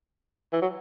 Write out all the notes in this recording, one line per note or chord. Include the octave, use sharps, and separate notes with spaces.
E3
F#3